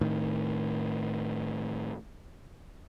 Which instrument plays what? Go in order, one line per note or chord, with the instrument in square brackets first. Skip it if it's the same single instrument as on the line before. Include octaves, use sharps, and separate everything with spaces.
[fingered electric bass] A2 D#3